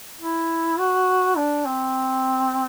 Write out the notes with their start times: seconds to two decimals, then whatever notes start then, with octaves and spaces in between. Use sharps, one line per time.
0.21 E4
0.79 F#4
1.37 D4
1.66 C4